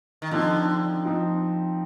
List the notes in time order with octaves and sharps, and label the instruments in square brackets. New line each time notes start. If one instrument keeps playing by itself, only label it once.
[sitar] D#3
[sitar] D3 [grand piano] F3 C4 D#4
[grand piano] F3 C4 D#4